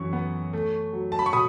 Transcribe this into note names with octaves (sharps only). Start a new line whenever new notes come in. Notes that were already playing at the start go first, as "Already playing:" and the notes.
Already playing: F#2 E3 C#6
B3
A3
F#3
A5
B5
C#6
B2 B5 D#6